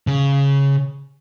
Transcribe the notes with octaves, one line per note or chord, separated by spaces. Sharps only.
C#3